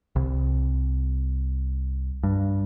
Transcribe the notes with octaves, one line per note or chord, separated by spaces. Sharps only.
C2
G2